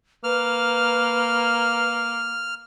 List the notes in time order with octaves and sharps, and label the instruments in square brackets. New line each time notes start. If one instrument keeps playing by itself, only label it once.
[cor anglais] A#3 [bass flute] B4 [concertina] F6